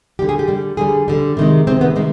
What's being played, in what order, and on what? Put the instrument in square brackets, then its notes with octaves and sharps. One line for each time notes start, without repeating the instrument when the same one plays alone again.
[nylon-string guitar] D3 G3 G4
G#4
G4
D3 G3
D3 G3 G#4
D3 G3
C3 D#3 G#3
C3 D#3 G#3 C4
B3
C3 D#3 G#3